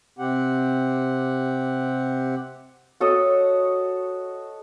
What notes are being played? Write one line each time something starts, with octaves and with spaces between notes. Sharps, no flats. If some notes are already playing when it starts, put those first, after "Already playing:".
C3 C4 G4 F#5
F#4 A4 C#5 D#5